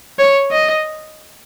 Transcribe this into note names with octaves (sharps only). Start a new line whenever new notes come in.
C#5
D#5